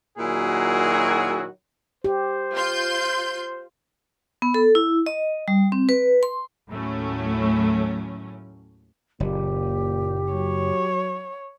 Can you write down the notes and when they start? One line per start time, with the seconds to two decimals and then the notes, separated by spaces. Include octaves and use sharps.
0.18 A#2 D#3 F#3 E4 F#4 G#4
2.04 G4 C5
2.54 F4 C6 G6
4.42 B3
4.54 A4
4.75 E4
5.06 D#5
5.48 G3
5.72 C4
5.89 B4
6.23 C6
6.69 D#2 A2 F#3 A3 C#4
9.20 F#1 A#2 G4
10.33 F#3 C#5